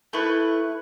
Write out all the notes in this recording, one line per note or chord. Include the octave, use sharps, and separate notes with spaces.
A3 E4 B4